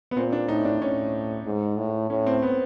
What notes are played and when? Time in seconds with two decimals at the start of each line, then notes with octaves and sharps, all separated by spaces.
0.11 B3
0.16 A#2 C4
0.32 D4
0.48 A2 D#4
0.65 D4
0.81 A2 C#4
1.46 G#2
1.78 A2
2.10 A2 C#4
2.26 C4
2.42 B3